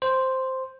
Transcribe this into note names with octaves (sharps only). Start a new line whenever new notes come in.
C5